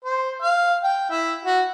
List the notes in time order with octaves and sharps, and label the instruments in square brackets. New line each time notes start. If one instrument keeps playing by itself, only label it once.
[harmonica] C5
F5
G5
E4
F#4